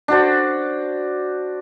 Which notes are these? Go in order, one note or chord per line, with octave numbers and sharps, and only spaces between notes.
D4 F#4 C5